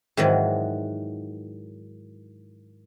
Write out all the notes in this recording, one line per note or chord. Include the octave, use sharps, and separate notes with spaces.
G#2 D#3 E3 F#3